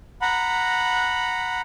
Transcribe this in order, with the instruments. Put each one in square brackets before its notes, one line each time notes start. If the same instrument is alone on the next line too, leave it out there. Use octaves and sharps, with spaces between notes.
[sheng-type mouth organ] F#5 A#5 B5